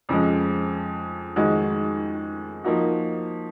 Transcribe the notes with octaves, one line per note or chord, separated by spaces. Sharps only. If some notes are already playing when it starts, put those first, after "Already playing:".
F2 C#3 F3 G#3
F2 D#3 G#3 D#4 F#4
F3 A#3 D#4 F#4